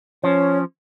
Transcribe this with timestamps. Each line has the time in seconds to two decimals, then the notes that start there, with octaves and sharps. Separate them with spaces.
0.24 F3 C#4 C#5